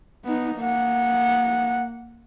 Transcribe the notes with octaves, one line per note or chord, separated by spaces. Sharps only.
B3 D#4
A#3 F#5